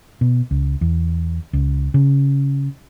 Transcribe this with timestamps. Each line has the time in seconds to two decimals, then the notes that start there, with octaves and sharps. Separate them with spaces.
0.21 B2
0.51 C#2
0.81 E2
1.53 C#2
1.94 C#3